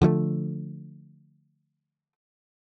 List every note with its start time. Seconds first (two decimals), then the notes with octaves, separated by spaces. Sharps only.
0.02 D3 F3 G3 A3